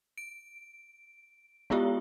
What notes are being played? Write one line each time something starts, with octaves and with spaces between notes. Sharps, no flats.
D7
G#3 B3 E4 F4 G4